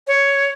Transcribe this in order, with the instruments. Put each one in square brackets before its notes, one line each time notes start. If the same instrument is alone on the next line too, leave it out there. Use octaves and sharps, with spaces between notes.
[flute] C#5